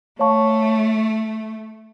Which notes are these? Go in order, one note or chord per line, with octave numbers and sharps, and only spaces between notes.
A3 C#5 F5 A5 C#6